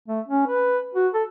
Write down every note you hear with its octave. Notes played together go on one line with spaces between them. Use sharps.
A3
C#4
B4
F#4
A4